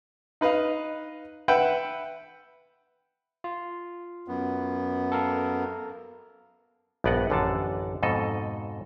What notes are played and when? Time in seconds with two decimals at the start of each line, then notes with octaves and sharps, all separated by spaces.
0.41 D#4 B4 D#5 F5
1.48 B4 E5 F#5 G5
3.44 F4
4.28 F#2 B3
5.12 A4 A#4 F5
7.04 A#1 G2 B3 D5 D#5 F#5
7.30 A1 F#2 D3 F4 A4 A5
8.03 F2 G#2 B2 A4 D#5